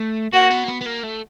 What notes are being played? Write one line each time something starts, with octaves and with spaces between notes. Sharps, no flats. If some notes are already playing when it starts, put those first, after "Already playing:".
Already playing: A3
A#3 F#4
B3
A#3
B3
B3
A#3
A3